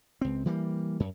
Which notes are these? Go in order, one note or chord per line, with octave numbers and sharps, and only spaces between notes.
C#2 C4
E3 G3 A#3
F#2